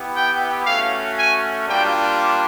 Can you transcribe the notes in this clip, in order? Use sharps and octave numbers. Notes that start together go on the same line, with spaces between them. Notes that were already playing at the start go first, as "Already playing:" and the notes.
Already playing: B3 E4 G4
G5
A3 C#4 F#4 F5
G#5
G3 A#3 D4 F4 G5